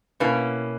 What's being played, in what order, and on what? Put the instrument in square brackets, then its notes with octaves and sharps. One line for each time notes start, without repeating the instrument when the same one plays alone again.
[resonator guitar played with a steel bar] B2 A#3 C#4 E4 [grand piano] B4